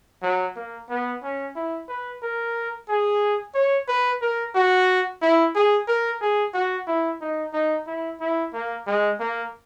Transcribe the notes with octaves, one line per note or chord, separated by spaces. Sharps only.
F#3
A#3
B3
C#4
E4
B4
A#4
G#4
C#5
B4
A#4
F#4
E4
G#4
A#4
G#4
F#4
E4
D#4
D#4
E4
E4
A#3
G#3
A#3